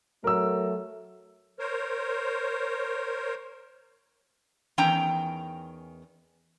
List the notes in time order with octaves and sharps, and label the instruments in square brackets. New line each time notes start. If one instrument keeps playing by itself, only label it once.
[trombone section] F#3 A3 [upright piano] A#4 E6
[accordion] A#4 C5 C#5
[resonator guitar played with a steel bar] E2 D#3 C#4 G5 A#5